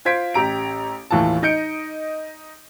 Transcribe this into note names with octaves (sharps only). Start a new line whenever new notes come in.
F4 C5 G#6 B6 D7
A1 G4 A#5 D7
D#2 A2 E3 F4 A5
D#4 D#5 G6 C#7 D7